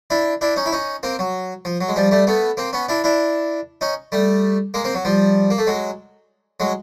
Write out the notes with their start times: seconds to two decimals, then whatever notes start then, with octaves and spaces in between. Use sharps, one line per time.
0.10 D4 E4
0.41 D4 E4
0.56 C#4 D#4
0.66 E4
0.72 C#4 D#4
1.03 A#3 C4
1.19 F#3
1.65 F3
1.81 F#3
1.88 G#3
1.96 F3 G3
2.11 G3 A3
2.27 A3 B3
2.57 A#3 C4
2.73 B3 C#4
2.89 D4 E4
3.04 D4 E4
3.81 C#4 D#4
4.12 G3 A3
4.74 G#3 A#3
4.84 A#3 C4
4.95 F#3
5.05 F3 G3
5.50 A#3
5.58 A3
5.67 F#3 G#3
6.60 F#3 G#3